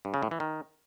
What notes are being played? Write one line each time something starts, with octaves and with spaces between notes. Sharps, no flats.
G2
C#3
A2
E3
D#3